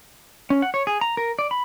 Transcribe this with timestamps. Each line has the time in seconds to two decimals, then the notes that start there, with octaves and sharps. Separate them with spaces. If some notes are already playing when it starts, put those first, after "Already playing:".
0.50 C#4
0.62 F#5
0.74 C#5
0.87 G#4
1.01 A#5
1.17 A#4
1.39 D5
1.51 B5